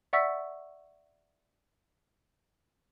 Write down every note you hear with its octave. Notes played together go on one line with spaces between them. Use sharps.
D5 E5 F#5 C#6 E6 B6